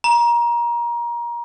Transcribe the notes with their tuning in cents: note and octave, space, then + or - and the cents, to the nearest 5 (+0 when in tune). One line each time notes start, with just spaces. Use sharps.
A#5 +25